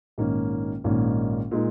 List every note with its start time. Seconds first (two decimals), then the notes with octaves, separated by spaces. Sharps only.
0.18 A#1 G#2 D#3 A#3 C#4
0.84 A#1 G#2 D#3 A#3 C#4
1.51 A#2 G#3 D#4